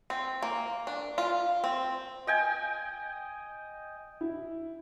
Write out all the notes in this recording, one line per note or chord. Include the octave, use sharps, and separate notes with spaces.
C4
A#3
D4
F4
C4
D#5 G5 G#5
E4